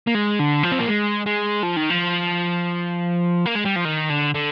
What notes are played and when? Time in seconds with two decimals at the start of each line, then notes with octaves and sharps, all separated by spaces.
0.07 A#3
0.15 G#3
0.39 D3
0.63 F3
0.72 C4
0.80 A#3
0.88 G#3
1.26 G#3
1.63 F3
1.76 D#3
1.90 F3
3.46 A#3
3.55 G#3
3.65 G3
3.76 F3
3.85 D#3
4.10 D3
4.34 D3